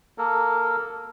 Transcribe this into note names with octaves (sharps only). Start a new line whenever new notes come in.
A#3 A4 A#4